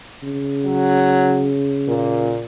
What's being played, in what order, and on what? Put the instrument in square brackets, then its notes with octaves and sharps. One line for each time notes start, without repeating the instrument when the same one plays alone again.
[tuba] C#3
[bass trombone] F#3
[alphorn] A#2 [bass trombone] A#3